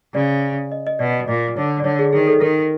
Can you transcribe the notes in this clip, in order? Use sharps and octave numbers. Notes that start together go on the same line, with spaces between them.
C#3 D5
D#5
D#5
B2 D5
A#2 D5
D3 C#5
D5
D3 C#5
G#4
D#3 G#4
A4
D#3 A#4